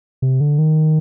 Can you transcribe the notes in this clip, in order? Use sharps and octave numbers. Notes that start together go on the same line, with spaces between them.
C3
D3
D#3